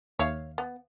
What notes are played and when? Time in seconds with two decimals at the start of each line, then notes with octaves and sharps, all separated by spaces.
0.19 D#2 C#5 E5 F5
0.58 B3